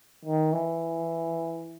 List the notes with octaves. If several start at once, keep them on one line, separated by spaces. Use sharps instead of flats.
D#3
E3